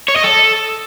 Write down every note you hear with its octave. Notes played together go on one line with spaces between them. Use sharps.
C#5
D#5
A4